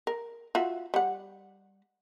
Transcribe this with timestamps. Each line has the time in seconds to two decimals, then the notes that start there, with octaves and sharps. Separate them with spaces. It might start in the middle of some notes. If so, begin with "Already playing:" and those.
0.07 A#4
0.55 F4 F#4 E5
0.94 G3 F#5